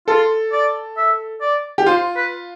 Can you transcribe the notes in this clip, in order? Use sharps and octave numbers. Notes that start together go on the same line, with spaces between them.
F4 A4
D5
E5
D5
G4
F4 C5
B4